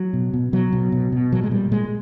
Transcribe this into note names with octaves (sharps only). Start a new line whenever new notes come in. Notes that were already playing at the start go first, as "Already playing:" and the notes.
Already playing: F#3
B2
B2
B2 F#3
B2
B2
B2
A#2 F#3
G#3
A#2 G3
A#2 G#3